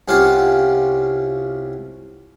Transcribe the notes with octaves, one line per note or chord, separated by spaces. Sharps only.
C2 C3 C#4 F4 F#4 F5